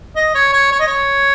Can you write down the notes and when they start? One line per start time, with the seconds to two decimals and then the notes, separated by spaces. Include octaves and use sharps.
0.16 D#5
0.35 C#5
0.53 C#5
0.71 C#5
0.80 D#5
0.87 C#5